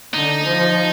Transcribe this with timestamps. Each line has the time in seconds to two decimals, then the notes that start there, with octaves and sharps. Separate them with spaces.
0.14 D3 D#4
0.44 F3